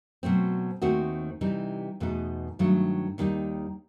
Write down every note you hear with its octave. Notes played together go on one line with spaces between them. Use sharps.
B2 F#3 A3 C4
D#2 D#3 A3 C4 F#4
C3 E3 G3 D#4
E2 B2 A3 D#4
G2 D#3 F#3 A3
D#2 D#3 G3 D#4